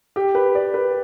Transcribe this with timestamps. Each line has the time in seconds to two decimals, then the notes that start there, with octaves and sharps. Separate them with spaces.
0.16 G4
0.35 B4
0.55 D5
0.74 B4